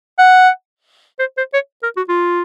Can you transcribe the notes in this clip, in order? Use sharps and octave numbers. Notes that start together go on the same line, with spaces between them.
F#5
C5
C5
C#5
A#4
F#4
F4